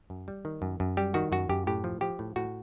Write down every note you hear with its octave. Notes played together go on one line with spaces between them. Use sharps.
F#2
G3
D#3
F#2
F#2
G3 G4
D#3 F#4
F#2 F#4
F#2 G4
A2 G4
F3
F3 G4
A2
A2 F#4